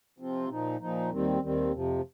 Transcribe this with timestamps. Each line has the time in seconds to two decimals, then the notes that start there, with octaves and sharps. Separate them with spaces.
0.18 C3 F3 C4 F4
0.48 A#2 F3 D#4
0.80 A#2 F3 D#4
1.11 D#2 D#3 G3 C4
1.41 D#2 D#3 G3 C4
1.71 F2 C3 F3